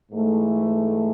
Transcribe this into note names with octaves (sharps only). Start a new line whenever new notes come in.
G#2 E3 A3